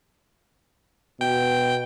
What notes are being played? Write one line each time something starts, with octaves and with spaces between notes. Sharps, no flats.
B2 G5